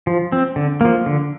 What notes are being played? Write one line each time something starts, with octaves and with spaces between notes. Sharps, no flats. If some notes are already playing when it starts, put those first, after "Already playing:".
F3
C4
D3
F3 A#3
D3